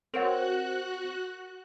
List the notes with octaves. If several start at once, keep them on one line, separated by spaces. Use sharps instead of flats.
C4 F#4 A#4 C#5 F#5 F#6